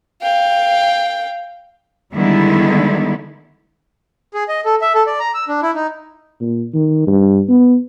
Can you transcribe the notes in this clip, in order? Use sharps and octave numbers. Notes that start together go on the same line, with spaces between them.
F5 G5
D3 D#3 G3 G#3 B3 E4
G#4
D#5
A4
E5
A4
D5
A#5
E6
D4
E4
D#4
A#2
D#3
G2
B3